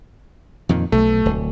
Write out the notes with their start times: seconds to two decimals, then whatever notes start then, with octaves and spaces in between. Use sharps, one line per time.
0.69 F2 A#2 D#3
0.92 B1 A3
1.25 D1